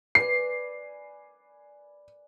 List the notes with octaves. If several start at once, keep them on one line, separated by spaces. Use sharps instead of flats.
B4 D5 G#5 C7